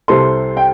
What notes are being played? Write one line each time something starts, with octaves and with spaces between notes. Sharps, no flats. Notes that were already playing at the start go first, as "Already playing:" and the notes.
C2 C3 G3 C4 A4 C6
G5